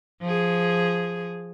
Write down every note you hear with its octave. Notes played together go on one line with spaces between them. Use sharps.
F3 G#4